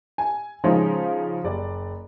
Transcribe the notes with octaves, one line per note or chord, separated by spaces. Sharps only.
G#5
C#3 F3 G#3 C#4 D#4 F4
F#1 D5